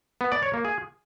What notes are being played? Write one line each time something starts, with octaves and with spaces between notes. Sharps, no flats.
B3
D5
C#5
A#3
G#4